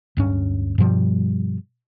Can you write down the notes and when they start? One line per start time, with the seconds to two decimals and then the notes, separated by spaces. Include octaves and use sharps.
0.17 D1 G2 C#4
0.78 G2 B2 F3 G3